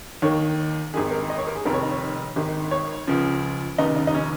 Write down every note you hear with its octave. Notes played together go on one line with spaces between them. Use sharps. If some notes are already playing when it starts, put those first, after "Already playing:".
D#2 D#3 C#5
G#1 G#2 D#3 G#4
A#4
D#5
C#5
A#4
G#4
F1 F2 D#3 A#4
C#5
D#4
C#5
G#1 G#2 D#3
C#5
C#2 C#3 F3
F1 D#2 C#3 D#4
D#4
D#4
C#4